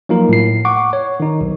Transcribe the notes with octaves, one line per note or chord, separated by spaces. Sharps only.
F3 F#3 A#3 D#4 F4 A#4
A2 C7
F#5 C#6 D6
C#5
D#3 D#4
B1